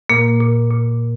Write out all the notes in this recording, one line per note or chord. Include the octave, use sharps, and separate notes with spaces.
A#2 A#3
A#2
A#2